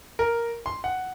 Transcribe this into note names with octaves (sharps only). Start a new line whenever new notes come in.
A#4
C6
F#5